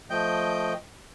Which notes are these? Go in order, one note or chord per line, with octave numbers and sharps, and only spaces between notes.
F3 A3 D#5 G5 G6